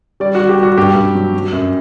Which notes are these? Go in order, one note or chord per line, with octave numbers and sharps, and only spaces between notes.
G3 D5
F#4
G3
G4
G3 F#4
G2 G4
G2
F#3
F#3
F#2